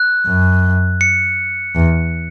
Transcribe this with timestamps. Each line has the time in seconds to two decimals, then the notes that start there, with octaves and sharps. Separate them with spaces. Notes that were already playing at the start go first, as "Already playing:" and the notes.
Already playing: F#6
0.27 F#2
1.01 C#7
1.75 E2